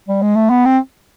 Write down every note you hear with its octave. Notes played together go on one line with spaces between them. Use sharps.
G3
G#3
A3
B3
C4